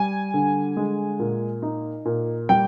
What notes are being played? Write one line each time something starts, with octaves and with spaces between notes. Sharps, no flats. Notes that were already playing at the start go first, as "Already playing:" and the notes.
Already playing: G3 G#5
D3
G#3
A#2
D#4
A#2
G3 G5